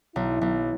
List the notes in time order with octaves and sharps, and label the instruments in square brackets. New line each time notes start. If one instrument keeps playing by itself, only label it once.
[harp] B1 [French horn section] E4
[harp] B1